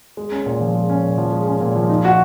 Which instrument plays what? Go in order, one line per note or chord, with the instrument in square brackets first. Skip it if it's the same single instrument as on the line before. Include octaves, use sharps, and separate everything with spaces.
[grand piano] G#3
C#4
A#2
F3
G#3
C#4
A#2
F3
G#3
C#4
A#2
F3
D#4
F#4